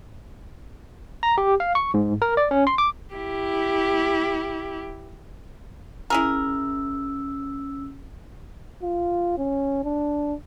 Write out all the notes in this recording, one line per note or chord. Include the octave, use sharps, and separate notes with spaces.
A#5
G4
F5
C#6
G#2
A#4
D5
C#4
C6
D6
E4 G4
C#4 E4 G#4 A#4 E6
F4
C#4
D4